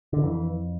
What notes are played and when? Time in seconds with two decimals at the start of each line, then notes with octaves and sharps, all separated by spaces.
0.13 D3
0.23 F2 E3